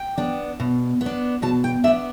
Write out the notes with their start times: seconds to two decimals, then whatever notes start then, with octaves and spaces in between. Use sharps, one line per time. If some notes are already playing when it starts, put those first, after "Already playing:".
Already playing: G5
0.18 B3 D4
0.60 B2
1.01 B3
1.06 D4
1.42 B2 A5
1.64 G5
1.84 D4 E5
1.88 B3